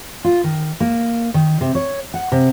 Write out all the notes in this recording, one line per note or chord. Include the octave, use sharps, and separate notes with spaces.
F4
D#3
A#3
D#3
C3
C#5
F#5
C3